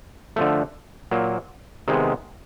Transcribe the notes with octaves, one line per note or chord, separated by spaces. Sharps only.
D3 F3 A3
A#2 F#3 A#3
C3 D#3 G#3 B3